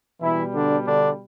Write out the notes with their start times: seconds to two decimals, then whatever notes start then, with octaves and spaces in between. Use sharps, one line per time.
0.20 B2 E3 G3 E4
0.53 D3 D4
0.86 D3 D4